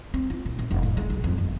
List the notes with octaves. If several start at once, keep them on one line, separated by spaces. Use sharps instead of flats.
C4
F4
B2
A#1
E1
A2
G#3
B1
F2
G1